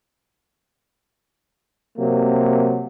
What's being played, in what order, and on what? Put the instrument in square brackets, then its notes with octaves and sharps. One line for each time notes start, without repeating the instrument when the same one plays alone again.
[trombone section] C3 F#3 A#3